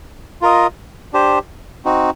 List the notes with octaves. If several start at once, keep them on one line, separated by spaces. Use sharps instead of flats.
F4 A#4 D#5
D4 G4 C5
C4 D#4 F#4